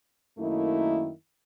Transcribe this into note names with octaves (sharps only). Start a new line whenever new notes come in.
F#2 D#3 A3 A#3 D#4 E4